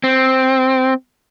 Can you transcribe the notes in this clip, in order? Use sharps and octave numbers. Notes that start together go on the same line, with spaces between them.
C4